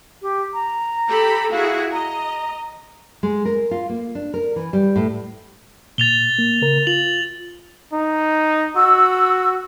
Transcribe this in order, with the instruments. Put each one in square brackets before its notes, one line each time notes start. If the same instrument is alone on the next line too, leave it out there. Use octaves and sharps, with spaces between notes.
[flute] G4
A#5
[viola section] G4 A4 B5
[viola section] E4 F#4 G#4 [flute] F5
[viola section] D#5 [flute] A#5
[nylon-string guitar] G#3
A#4
F4
A#3
D4
A#4
E3
G3
A2
[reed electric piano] A#2 [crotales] A6 F7 G7
[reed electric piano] A#3
C#3 A#4
[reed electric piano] F4 [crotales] F#7
[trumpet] D#4
[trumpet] F#4 [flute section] E6